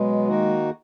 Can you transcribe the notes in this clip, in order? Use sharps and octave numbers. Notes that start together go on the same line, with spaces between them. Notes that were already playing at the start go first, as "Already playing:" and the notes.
Already playing: B2 F#3 G#3 B3
D#3 A#3 D#4 F#4